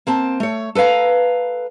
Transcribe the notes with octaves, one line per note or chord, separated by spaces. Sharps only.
A#3 C4 A5
A3 C#5
A4 B4 C#5 F5 A#5